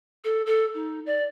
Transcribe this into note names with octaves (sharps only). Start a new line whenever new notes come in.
A4
A4
D#4
D5